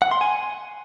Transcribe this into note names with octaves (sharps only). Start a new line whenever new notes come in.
F#5
C6
G#5